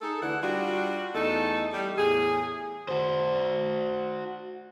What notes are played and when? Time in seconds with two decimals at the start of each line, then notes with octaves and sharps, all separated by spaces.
0.01 D#4 G#4 A4
0.21 D2 D3 E3 E4 F#5
0.43 G3 D4 F4 F#4
1.14 E2 A3 D#4 A4
1.73 G3
1.98 E2 A2 G#4
2.89 F#4 C5